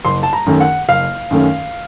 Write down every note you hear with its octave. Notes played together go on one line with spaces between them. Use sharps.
F#1 C6
A5
A#5
F#2 D#3 A3 C#4
F#5
F#1 F5
F#2 D#3 A3 C#4